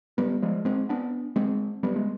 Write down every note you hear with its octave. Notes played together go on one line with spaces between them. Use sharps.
G3 B3
F3 G#3
G#3 C4
B3 D4
G#3 C4
G3 B3
G#3